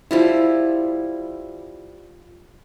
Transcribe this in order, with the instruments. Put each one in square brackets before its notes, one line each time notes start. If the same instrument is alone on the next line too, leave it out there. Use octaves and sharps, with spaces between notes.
[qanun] F3 G3 E4